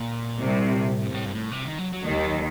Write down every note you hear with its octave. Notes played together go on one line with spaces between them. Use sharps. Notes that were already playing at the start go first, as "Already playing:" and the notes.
Already playing: A#2
C2 C3
A2
G2
A2
G2
A2
C3
D#3
F#3
F#3
D#2 D#3 G3
F#3